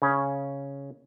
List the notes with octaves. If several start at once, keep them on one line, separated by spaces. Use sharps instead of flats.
C#3 C#4